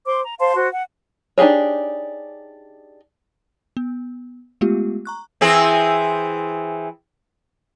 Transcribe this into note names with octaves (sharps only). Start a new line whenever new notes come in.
C5 C6 D6
A#5
C5 F5 A5 C6
F#4 C5
F#5
D4 D#4 G4 G#4 C#5
B3
G#3 A3 B3 F4 G4
A#5 C#6 F#6
E3 C4 G#4